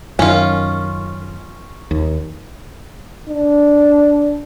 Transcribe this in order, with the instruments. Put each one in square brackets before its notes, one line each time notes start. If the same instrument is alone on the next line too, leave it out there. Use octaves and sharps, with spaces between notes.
[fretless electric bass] F#2 D#3 [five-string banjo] C#4 F4
[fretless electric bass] D#2
[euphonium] D4